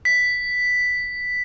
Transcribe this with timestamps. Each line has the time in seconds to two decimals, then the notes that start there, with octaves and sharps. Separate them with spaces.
0.05 B6